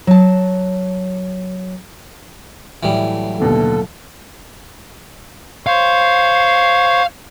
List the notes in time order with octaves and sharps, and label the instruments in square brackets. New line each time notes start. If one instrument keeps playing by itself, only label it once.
[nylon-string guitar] F#3 A5
[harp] A2 F#3 A3 [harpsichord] E3 G3
[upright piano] D#2 B2 D3 [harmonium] A4
[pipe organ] C5 C#5 [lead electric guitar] F5